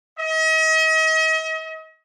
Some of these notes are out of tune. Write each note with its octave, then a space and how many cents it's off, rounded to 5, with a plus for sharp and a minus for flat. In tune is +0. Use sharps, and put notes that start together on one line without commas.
D#5 +40